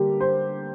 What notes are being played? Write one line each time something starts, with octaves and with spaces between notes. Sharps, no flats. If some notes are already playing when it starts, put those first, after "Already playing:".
Already playing: D3 G3 A#3 G4
C5